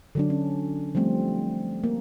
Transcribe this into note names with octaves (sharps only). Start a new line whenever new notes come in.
D3 F#3 D4
C#4
F3 G3 A3 C4
A#3